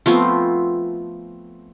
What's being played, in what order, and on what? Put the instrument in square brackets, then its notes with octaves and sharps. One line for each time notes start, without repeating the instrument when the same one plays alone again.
[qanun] F3 A3 B3 C4